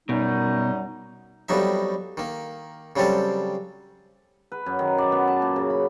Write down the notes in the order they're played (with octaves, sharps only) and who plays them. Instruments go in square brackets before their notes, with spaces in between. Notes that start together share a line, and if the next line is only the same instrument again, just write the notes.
[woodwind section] F#2 G3 D#4 [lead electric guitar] B2
[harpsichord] F2 B2 F#3 G3 D#4 E5
D#3 A#3
C#3 F#3 G3 C4 A4
[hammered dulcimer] B4
F#2
D#3
D5
B3
A5
A#2
C#3
B5